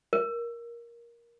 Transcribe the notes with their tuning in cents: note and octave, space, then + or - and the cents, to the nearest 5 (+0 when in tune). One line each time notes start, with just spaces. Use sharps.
A#4 +10